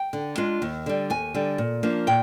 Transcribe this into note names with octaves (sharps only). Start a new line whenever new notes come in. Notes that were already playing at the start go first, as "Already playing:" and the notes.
Already playing: G5
D3
G#3 D4 F4
D#2
D3 G3
D#2 G#5
D3 G3
A#2
F3 A#3 D4
A#2 G5